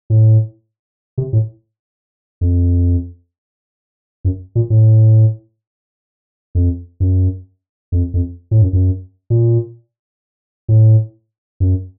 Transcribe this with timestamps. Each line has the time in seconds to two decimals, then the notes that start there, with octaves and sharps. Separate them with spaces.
0.10 A2
1.18 C3
1.33 A2
2.41 F2
4.25 F#2
4.55 A#2
4.70 A2
6.55 F2
7.00 F#2
7.92 F2
8.14 F2
8.51 A2
8.62 F#2
8.73 F#2
9.30 A#2
10.69 A2
11.60 F#2